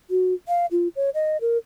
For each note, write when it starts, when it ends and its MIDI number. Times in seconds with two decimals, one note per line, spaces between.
0.10 0.34 66
0.48 0.66 77
0.71 0.88 65
0.96 1.10 73
1.14 1.37 75
1.41 1.58 70